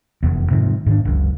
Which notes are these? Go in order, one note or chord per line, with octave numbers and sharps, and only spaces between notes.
F1 E2
G#2 C3 D#3 F3
G#2 D#3 D4
F#1 C#2